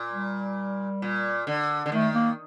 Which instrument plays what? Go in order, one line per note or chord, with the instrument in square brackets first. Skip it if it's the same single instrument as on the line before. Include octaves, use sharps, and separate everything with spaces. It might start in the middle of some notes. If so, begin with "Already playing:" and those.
Already playing: [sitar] A#2
[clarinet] G3
[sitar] A#2
D3
D3
[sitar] D#3 [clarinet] A3
[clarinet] A#3